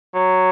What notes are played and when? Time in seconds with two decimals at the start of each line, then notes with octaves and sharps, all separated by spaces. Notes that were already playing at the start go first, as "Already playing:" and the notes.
0.15 F#3